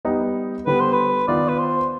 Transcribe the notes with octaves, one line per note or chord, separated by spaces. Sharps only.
G3 B3 D#4
D3 G3 B3 B4
C5
B4
D#3 B3 F4 D5
B4
C5